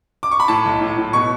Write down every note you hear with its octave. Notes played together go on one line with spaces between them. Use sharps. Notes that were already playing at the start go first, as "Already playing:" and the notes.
D6
C#6
B5
A2 A5
B1
A2
A2
B2 C#6